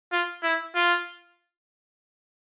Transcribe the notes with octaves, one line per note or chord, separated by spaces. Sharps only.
F4
E4
F4